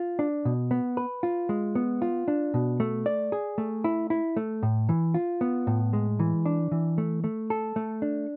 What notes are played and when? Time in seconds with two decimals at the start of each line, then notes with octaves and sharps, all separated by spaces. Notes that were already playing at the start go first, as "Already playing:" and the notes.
Already playing: F4
0.19 D4
0.45 B2
0.71 B3
0.97 B4
1.23 F4
1.49 G#3
1.75 B3
2.02 F4
2.28 D4
2.54 B2
2.80 A3
3.06 D5
3.32 G#4
3.58 A3
3.84 E4
4.10 E4
4.36 A3
4.63 A2
4.89 E3
5.14 F4
5.41 B3
5.67 A2
5.93 G#3
6.19 E3
6.45 D4
6.71 E3
6.98 A3
7.24 A3
7.50 A4
7.76 A3
8.02 D4